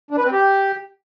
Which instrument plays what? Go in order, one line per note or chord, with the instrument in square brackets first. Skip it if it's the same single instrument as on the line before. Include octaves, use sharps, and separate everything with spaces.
[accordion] D4
B4
C4
G4